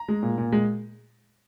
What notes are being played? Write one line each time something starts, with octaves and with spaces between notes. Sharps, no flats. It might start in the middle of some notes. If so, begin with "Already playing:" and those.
Already playing: A#5
G#3
A#2
A#2
G#3